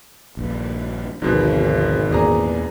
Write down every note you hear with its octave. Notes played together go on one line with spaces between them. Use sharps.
A#1 G2
G#1 D2 G#2 B2 F3
E2 A#2 D4 G#4 A#5